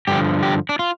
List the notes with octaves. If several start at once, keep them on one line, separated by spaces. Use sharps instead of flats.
G2 D3 F3 G4
G4
D4
F4